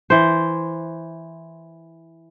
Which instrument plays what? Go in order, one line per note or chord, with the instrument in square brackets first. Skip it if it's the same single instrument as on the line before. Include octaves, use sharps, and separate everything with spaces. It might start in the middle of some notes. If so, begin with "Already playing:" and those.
[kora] E3 C5